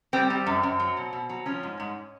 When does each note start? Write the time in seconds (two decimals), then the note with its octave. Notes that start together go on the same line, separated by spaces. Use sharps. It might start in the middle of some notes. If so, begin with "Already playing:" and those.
0.13 G3 C4
0.30 G3
0.46 F#2
0.63 F#2
0.80 F#3
0.97 B2
1.13 B2
1.30 F#3
1.46 F3 C#4
1.63 G#2
1.80 G#2